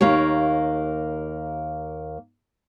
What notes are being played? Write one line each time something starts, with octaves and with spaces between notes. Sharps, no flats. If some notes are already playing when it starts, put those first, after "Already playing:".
D#2 A#3 G4 C#5